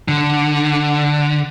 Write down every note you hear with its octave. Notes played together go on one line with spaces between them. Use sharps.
D3